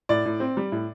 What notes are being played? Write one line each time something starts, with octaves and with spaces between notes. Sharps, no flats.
A2 D5
A2
C4
G3
A2